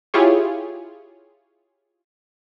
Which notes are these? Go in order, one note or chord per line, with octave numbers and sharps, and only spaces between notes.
E4 F4 G4 G#4 C#5